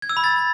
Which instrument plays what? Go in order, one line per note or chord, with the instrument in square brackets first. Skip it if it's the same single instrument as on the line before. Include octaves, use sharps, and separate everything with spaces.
[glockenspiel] G#6
E6
B5
A6